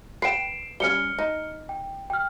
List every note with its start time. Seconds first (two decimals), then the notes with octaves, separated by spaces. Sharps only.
0.22 B4 G5 C7 D7 E7
0.80 G3 C#4 F6 C#7 G7
1.18 D#4
1.69 G5
2.10 G5 F6